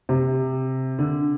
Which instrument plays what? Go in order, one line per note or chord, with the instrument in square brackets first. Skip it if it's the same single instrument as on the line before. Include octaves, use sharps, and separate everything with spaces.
[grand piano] C3
D3